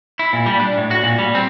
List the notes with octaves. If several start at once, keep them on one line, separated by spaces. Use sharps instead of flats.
E4
A#2
G3
D4
A2
F#4
A#2
G3
C4